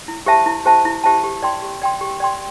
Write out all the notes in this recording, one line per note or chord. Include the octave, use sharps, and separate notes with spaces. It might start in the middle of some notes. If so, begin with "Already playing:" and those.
E4
G4 C5 E5 A5
E4
G4 C5 E5 A5
E4
G4 C5 E5 A5
G4
D5 G5 C6
G4
D5 G5 C6
G4
D5 G5 C6